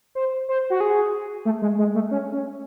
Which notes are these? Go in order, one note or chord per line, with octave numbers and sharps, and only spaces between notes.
C5
C5
F#4
G#4
A3
G#3
G#3
A3
C#4
C#4